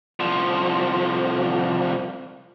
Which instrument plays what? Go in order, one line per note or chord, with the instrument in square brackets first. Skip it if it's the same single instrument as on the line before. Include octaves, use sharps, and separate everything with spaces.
[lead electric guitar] C2 F3